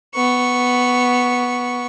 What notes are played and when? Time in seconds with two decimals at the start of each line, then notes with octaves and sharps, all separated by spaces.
0.15 B3 C#6